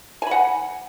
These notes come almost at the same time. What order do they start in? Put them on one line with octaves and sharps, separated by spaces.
G#5 B5 F#5